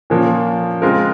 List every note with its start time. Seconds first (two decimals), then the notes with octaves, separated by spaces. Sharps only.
0.10 A#2 F3 A#3 C#4
0.82 C#3 G#3 C4 F4 A#4